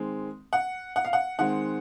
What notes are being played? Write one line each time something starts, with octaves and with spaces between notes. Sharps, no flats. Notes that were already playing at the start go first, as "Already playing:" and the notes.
Already playing: D#3 G#3 C4
F#5
F#5
F5
F#5
D#3 G#3 C4 F#5